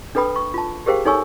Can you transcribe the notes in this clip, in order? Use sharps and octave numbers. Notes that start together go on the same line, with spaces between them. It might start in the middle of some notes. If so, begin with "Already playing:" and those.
D4 A4 B4 G5 B5 D#6
C#6
F4 A5
G4 G#4 A#4 C5 F5 G5
D#4 A4 C#5 G#5 C#6 E6